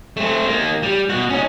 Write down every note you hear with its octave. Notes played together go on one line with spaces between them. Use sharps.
A3 C4
D#3 A#3
G3
B2 F#4
C#4 D#4